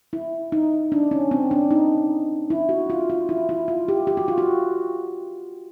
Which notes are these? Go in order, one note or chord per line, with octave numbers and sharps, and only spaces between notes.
E4
D#4
D4
C#4
C4
D4
D#4
E4
F#4
F4
F4
E4
E4
F4
G4
G4
F#4
F4
F#4